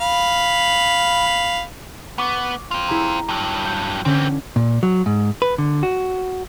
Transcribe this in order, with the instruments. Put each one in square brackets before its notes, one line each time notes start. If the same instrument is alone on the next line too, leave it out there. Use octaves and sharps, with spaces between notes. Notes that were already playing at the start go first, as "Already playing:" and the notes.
[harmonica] F5 B5
[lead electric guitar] B3 [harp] C#6 D6
[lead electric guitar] C4 F4
[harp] E4 G#4 A#5
[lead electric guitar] G2 F#3
[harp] G6 C#7
[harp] D3 C#4 [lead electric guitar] E3 C4
[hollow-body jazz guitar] A#2
F#3
G#2
B4
D3
F#4